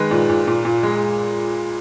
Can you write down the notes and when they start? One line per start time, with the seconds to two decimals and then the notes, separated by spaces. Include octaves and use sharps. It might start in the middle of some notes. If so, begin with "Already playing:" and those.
Already playing: D#3 G#3 B4
0.11 A#2
0.29 A#2
0.48 A#2
0.65 A#2
0.83 G#3